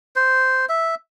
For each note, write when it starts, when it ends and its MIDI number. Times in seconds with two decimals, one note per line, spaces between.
0.16 0.66 72
0.69 0.95 76